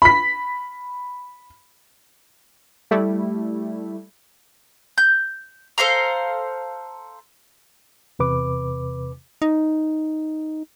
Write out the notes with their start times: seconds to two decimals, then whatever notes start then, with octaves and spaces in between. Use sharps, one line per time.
0.02 B5 B6
2.91 G3 A3 E4
4.98 G6
5.78 A4 C5 F5 A#5
8.19 E2 C3 B4 D6
9.42 D#4